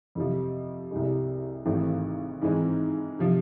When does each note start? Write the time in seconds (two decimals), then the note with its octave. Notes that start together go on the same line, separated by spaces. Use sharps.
0.15 F2 C3 F3
0.91 C2 C3 G#3
1.66 G#1 G#2 E3 A3 C4
2.41 G#2 E3 G#3 C4
3.19 C3 F3